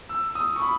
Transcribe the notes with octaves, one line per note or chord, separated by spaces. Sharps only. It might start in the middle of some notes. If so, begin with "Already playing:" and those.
E6
D#6
C#6
B5